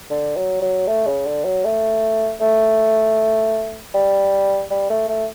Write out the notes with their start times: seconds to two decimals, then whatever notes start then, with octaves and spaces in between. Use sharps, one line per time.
0.10 D3
0.37 F#3
0.62 F#3
0.87 A3
1.06 C#3
1.26 D3
1.45 F#3
1.64 A3
2.41 A3
3.94 G3
4.71 G3
4.90 A3
5.09 A3